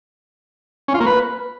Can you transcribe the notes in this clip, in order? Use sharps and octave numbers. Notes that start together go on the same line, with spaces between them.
C#4
F4
A#3
B4